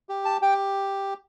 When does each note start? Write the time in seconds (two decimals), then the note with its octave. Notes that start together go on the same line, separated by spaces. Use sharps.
0.09 G4
0.25 A5
0.42 G4 G5